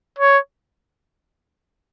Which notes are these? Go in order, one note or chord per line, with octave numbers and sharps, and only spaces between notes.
C#5